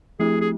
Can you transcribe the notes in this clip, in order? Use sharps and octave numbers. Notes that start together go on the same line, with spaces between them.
F3 A3 C4 E4 G4 G#4
G#4